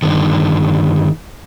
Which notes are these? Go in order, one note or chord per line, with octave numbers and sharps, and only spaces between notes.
G2 D3 D#3